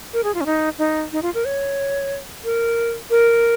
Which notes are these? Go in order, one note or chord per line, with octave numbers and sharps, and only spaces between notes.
A#4
G#4
F4
C#4
D#4
D#4
D#4
F4
A#4
C#5
A#4
A#4